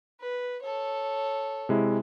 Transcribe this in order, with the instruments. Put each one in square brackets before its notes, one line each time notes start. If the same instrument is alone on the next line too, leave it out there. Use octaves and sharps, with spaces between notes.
[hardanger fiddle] B4
A4 C#5
[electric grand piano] C3 G#3 E4